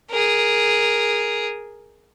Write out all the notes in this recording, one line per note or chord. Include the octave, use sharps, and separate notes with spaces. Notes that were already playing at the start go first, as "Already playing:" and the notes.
G#4 A#4